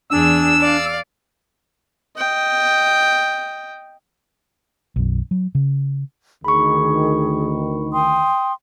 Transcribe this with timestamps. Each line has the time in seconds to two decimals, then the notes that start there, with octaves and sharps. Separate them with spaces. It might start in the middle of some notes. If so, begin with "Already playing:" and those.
0.11 E2 D4 G#4 E6
0.60 D5 F5
2.17 D#5 G5
4.96 B1 F#2
5.31 F#3
5.55 C#3
6.44 D2 D#3 G#4 B5 C#6
7.93 G5 C6 D#6